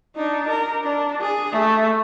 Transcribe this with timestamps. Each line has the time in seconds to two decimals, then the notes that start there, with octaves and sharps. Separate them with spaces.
0.16 D4 D#4
0.48 A#4
0.83 D4
1.21 G#4
1.52 A3